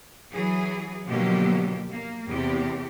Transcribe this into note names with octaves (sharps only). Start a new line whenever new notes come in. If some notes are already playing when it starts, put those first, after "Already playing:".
E3 F#3 G#4
B2 D3 F3 F#3 A#3 G4
A#3
E2 C3 G4